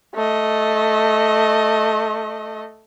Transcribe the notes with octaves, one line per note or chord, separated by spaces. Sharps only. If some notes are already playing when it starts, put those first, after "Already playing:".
A3 D#5